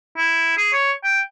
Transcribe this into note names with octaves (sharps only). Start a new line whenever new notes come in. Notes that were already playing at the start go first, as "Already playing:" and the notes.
E4
G#4
C#5
G5